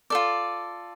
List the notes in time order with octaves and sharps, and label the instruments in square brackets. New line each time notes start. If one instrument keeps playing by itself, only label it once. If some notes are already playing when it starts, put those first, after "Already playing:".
[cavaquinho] F4 A4 D5